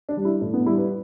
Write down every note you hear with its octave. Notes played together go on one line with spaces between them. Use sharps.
D4
G3
E4
A2 D4
B3
G3 E4
B4